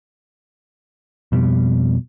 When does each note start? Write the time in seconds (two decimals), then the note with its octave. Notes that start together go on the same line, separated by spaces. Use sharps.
1.32 F2 B2 G3